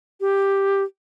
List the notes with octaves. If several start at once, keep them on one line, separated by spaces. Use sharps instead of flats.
G4